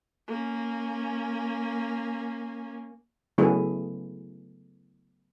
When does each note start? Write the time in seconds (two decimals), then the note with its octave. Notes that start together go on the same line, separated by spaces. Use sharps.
0.28 A#3 C#4
3.38 C#3 F#3 A3 B3 E4 G#4